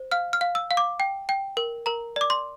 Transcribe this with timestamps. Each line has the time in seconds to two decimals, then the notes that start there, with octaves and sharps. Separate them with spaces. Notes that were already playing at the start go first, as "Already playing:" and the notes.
Already playing: C5
0.11 F5 F6
0.33 F6
0.41 F5
0.55 E6
0.71 F5
0.77 D6
1.00 G5
1.29 G5
1.57 A#4
1.86 A#4 A#5
2.16 D5 D6
2.30 C6